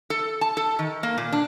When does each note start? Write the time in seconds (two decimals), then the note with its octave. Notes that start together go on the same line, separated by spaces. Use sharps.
0.10 A4
0.41 A5
0.57 A4
0.79 D#3
1.03 A#3
1.18 A#2
1.32 D4